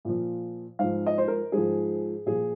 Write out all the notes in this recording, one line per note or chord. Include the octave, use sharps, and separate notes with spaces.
A#2 F3
G#2 F3 F5
D#5
C5
A#4
G#2 F3 G#4
A#2 F3 G#4